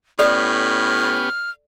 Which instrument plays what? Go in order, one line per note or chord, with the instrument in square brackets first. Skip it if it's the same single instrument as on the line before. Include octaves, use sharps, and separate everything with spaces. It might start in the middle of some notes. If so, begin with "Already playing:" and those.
[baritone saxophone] A2 [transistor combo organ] B3 C#4 G4 [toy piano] A4 D5 [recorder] F6